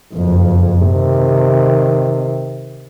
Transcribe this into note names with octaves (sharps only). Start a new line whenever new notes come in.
F#1 F2
C3 D#3